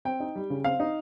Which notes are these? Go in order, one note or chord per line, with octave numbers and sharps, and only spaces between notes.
C4 G5
D#4
G3
C#3
C4 F5
D#4